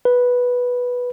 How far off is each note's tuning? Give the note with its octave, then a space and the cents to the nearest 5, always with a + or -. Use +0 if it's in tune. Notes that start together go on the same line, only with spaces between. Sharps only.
B4 -5